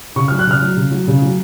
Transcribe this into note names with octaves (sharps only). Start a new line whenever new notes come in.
C#3 C#6
F#3 F6
F#6
C#3 F6
F#3
C#3
F#3
C#3
F#3